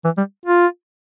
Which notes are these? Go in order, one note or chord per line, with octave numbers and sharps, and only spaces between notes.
E3
G3
F4